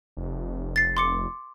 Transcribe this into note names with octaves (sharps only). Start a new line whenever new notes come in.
F1
A6 C7
C6 D6 C#7